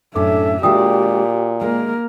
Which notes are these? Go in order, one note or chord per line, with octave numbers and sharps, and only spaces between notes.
F#2 A2 C#4 D4 A4 E5 D6
A#2 G#3 D4 F#4 G4 G5 D#6
G#3 A#3 A#4